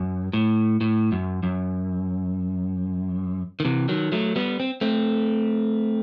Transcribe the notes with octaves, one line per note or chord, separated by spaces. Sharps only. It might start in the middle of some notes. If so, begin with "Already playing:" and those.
Already playing: F#2
A2
A2
F#2
F#2
D#3
C3 E3
D#3 F#3
F#3 A3
G3 B3
C4
A3 C4